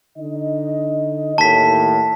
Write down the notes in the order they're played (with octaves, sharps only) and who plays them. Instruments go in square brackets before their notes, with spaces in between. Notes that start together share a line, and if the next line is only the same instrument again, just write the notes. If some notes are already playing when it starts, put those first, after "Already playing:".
[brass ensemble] D3 D#4 D#5
[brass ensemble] D#2 A2 [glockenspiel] A5 B6